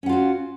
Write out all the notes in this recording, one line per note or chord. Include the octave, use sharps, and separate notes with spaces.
C#4 F4 F#4 F#5